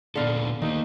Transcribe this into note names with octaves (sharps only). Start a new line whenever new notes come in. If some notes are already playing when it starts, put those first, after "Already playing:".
A#2 D3 B3 A4 F5
D#3 A#3 D#4 C5